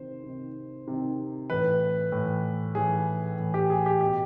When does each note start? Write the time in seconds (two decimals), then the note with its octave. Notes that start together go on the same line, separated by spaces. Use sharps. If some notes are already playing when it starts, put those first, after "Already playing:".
Already playing: C3 D#3 C5
0.24 C3
0.29 D#3
0.88 C3 D#3
1.50 A2 E3 B4
2.12 A2 E3
2.75 A2 E3 G#4
3.39 A2 E3
3.54 G4
3.70 G#4
3.86 G4
4.01 B2 G4